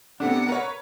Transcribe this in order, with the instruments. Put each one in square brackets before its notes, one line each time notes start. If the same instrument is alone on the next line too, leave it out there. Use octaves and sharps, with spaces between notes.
[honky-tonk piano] C3 A3 C4 [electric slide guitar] B3 D4 [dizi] F#5
[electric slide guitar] A#4 [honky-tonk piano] B4 C#5